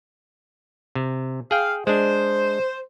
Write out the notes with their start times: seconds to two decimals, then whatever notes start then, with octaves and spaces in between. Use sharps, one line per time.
0.95 C3
1.51 G#4 F5 G5
1.87 G#3 D4 C5